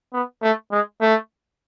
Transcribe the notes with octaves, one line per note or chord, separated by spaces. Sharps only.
B3
A3
G#3
A3